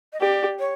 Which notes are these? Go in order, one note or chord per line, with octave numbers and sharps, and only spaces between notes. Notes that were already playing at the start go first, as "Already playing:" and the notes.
D#5
G4 D5
C#5